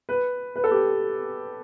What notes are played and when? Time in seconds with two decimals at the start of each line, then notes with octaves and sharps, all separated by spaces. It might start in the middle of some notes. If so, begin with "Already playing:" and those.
0.09 B4
0.56 B4
0.64 A4
0.71 G4